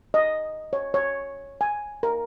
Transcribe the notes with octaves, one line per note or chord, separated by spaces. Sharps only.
D#5
C#5
C#5
G#5
A#4